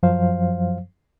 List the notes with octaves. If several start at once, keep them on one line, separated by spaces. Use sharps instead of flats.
F#2 F3 F#3 C5 F5